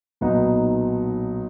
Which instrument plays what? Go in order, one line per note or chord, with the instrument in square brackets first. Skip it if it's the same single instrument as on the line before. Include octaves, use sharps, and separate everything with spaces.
[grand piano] B1 A#2 F#3 B3 D#4